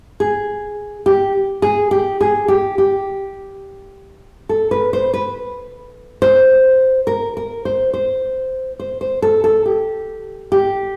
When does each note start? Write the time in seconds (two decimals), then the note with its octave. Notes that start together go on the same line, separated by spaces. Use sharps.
0.20 G#4
1.06 G4
1.62 G#4
1.91 G4
2.21 G#4
2.48 G4
2.78 G4
4.49 A4
4.71 B4
4.93 C5
5.14 B4
6.22 C5
7.07 A#4
7.37 A#4
7.65 C5
7.94 C5
8.80 C5
9.01 C5
9.22 A4
9.44 A4
9.66 G4
10.52 G4